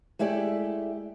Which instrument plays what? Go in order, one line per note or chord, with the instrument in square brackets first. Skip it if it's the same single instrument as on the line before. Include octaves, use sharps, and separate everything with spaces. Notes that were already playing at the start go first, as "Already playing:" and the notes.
[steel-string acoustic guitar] G#3 A3 E4 G4 D5